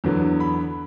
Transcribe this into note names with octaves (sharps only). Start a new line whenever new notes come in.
E2 D3 F#3 B3
B5